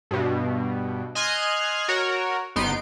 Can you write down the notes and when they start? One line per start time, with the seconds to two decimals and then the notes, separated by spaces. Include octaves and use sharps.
0.11 G2 B2
1.15 D#5 G#5 C6 F6 F#6 G#6
1.88 F#4 A#4 C#5
2.56 G1 B3 D#4 C6 D7